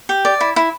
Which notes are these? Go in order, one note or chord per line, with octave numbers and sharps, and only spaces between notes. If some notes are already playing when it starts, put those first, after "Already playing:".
G4
D5
E4
E4